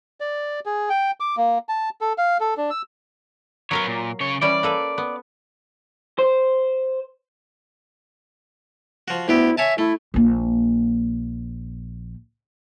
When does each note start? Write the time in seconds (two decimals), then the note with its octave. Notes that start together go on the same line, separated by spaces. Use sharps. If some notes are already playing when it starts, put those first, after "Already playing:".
0.20 D5
0.66 G#4
0.90 G5
1.20 D6
1.37 A#3
1.69 A5
2.01 A4
2.18 F5
2.40 A4
2.57 D4
2.70 E6
3.71 F#3 B3 A#4 C#5 F5
3.87 A#2
4.20 C#3 C#5
4.42 E3 G3 C#4 D5
4.63 A#3 A4 B4
4.98 B3
6.19 C5
9.08 F3 F#4
9.28 D2 B3 E4 G4
9.58 C#5 E5 G#5 A5
9.78 A3 E4
10.14 A#1 A#3